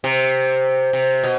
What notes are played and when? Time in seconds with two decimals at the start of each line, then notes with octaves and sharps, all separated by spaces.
0.04 C3
0.93 C3
1.23 B2